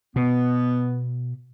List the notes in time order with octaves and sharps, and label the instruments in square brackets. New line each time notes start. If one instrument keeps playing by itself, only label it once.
[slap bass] B2 [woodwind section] B3